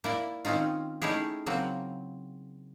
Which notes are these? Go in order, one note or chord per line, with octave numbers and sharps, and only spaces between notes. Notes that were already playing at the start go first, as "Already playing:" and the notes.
A#3 E4 D5
D#3 C4 C#4 D#4 F4
A3 C#4 D#4 E4 G4 G#4
C#3 F#3 A#3 C4